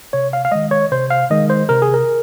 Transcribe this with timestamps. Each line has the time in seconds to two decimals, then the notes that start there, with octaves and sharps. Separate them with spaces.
0.13 C3 C#5
0.33 F5
0.45 F5
0.52 D#3 G#3 D#5
0.71 C#5
0.92 C3 C5
1.10 F5
1.30 D#3 G#3 D#5
1.50 C5
1.69 C3 A#4
1.82 G#4
1.94 A#4